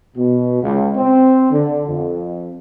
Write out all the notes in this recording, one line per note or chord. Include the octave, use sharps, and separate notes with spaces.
B2
C#2
C4
D3
F2